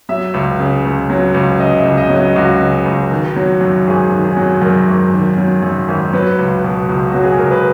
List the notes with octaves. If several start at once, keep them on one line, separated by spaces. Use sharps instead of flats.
F#3 E5
C#2
C#3
C#2
F#3
C#2
C#3 D#5
E5
C#2
D#5
F#3
D#5
C#2 F#4
C#3
C#2
D#3
F#3
F#2
G#1 G#4
D#3
G#4
F#3
F#2 A#4
G#1
D#3
F#3
F#2
G#1
F#3 B4
C#2
B2
C#2
F#3 F#4
G#4
C#2 A#4
B4